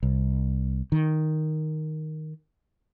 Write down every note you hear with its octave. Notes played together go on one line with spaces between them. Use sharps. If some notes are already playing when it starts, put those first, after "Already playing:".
C2
D#3